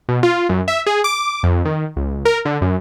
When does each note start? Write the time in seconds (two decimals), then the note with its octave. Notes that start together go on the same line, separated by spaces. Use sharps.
0.09 B2
0.23 F4
0.49 F#2
0.68 E5
0.86 G#4
1.04 D6
1.43 F2
1.65 D#3
1.96 C#2
2.25 A#4
2.45 D3
2.61 F#2